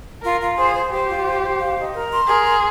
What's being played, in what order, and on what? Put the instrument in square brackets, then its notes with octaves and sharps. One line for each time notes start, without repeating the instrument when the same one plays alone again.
[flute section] F4 [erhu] A#4
[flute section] F4
[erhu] G#4 [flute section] C5
[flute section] C5
[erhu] G4 [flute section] C5
[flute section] F4
C5
C5
F5
D#4
A#4
C6
[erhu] G#4 [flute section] A#4
[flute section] C6